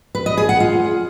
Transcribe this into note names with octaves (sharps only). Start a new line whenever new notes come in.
B4
D#5
G#4
F#5
F4